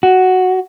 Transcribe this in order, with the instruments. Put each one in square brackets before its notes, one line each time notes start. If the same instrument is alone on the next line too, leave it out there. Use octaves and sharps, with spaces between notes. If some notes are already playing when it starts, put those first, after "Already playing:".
[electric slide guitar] F#4